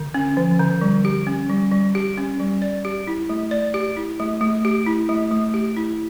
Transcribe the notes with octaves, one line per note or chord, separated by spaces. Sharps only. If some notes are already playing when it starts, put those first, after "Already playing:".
Already playing: D3
C#4
F3
D3
G3
G4
C#4
G3
G3
G4
C#4
G3
D5
G4
E4
A3
D5
G4
E4
A3
A3
G4
E4
A3
A3
G4
E4